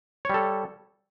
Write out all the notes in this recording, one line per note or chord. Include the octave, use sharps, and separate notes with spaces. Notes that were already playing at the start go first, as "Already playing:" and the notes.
G3 A4 C#5